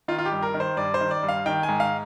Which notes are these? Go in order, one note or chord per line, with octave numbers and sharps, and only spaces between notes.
D#3 F4
F4
G4
G2
A#4
D#3
C5
G2 D5
C5
D#3
D5
G2
F5
D#3 G5
G#5
G#2
F5